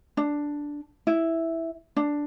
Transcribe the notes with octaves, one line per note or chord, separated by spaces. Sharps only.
D4
E4
D4